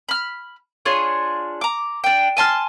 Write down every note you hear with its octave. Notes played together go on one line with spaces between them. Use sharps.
B5 F6
D4 F4 G#4 C#5
A#5 D6
D4 G5
G#5 A5 C6 F6